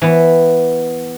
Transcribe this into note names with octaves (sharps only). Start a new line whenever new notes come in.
E3 B3